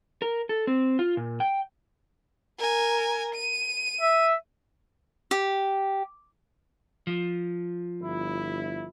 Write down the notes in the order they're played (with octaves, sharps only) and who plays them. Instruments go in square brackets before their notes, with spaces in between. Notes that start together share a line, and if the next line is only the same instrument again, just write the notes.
[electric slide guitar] A#4
A4
C4
F4
A#2
G5
[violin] A#4 G#5
D#7
[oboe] E5
[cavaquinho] G4
[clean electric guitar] F3
[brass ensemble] G1 E4